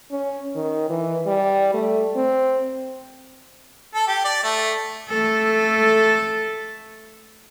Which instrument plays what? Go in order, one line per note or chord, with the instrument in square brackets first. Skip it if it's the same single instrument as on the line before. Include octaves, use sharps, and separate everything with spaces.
[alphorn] C#4
D#3
E3
G3
A3
C4
[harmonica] A4
G4
D5
A3
[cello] A3 A4